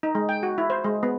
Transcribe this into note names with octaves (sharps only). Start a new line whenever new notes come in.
D#4
G#3
G5
F#4
E4
C5
G#3
B3